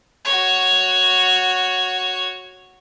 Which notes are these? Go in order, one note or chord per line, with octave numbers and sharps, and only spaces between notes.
F#4 C#5